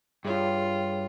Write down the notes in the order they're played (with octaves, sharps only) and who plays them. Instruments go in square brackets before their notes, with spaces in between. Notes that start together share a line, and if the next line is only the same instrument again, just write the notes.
[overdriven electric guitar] G2 [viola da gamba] F4 [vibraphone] G#4 C#5 G5